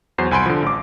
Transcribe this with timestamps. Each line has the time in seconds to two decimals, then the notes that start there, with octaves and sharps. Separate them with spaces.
0.18 E2 F#3 C5 C7
0.31 C2 G#5 B5 C6 D7
0.46 D3 F3
0.63 A1 D6